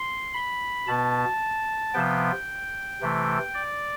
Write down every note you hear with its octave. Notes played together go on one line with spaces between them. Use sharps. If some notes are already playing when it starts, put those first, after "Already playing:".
Already playing: C6
B5
B2 B3 A5
C3 F3 B3 G5
C3 E3 A3
D5